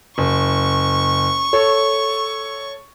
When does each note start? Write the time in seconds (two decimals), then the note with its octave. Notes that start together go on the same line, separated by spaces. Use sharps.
0.18 F#1 C#6
1.53 A4 C#5